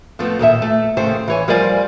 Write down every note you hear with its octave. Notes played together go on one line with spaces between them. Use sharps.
F3 A3 B3 C4
D#2 A#2 A4 E5
A3
D#2 C#3 A3 C4 C5 G5
E3 C#5 G#5
F3 G3 A#4 C5 D5 G#5